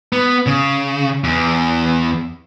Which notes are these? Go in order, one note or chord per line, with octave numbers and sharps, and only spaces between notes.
B3
C#3
E2